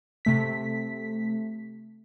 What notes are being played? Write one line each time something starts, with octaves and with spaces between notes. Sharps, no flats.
C3 A3 B6